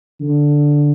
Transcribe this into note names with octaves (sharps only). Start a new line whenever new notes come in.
D3